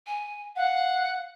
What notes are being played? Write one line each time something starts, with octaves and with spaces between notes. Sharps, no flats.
G#5
F5 F#5